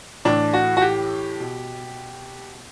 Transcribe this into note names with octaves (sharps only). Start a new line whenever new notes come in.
A2 E3 D4
F#4
F#4
G4
B2